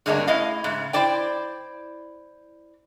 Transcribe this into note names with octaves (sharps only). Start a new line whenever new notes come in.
G2 D3 G#3 A#3 C#4 D4
A3 E4 D#5 F5
G#2 C#3
E4 C5 D5 G5